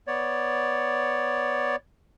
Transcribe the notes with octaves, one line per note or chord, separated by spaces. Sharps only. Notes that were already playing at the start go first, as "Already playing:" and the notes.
B3 C#5 D5